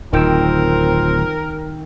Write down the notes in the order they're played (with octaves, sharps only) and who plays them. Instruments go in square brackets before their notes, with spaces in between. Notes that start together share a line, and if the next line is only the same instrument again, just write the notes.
[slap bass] D1 [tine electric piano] D#3 G5 E6 [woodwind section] C4 F4 [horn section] A#4